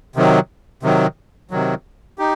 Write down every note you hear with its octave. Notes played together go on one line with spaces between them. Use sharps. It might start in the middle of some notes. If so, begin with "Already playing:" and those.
C3 D#3 F#3
C3 D#3 F#3
C3 D#3 F#3
D#4 G4